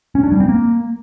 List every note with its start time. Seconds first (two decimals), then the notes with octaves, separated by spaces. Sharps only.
0.15 C#4
0.23 D4
0.32 G3
0.40 C4
0.49 A#3